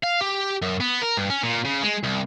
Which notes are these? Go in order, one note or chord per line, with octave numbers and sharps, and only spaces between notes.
F5
G4
F#2
B3
A#4
G2
C#4
A#2
C#3
G#3
C2